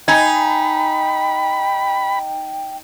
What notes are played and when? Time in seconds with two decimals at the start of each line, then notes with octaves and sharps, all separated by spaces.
0.08 D#4 G5 G#5 B5